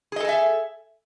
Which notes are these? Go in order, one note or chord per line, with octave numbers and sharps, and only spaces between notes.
G#4 A4 D#5 E5 G#5